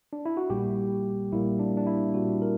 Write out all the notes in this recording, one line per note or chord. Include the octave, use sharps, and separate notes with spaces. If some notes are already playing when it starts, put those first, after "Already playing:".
D4
E4
F#4
A#1 A#2 G3 A#3 G4
A#1 A#2 G3 A#3 E4
D4
D4
E4
A#1 A#2 G3 A#3 F#4
A#4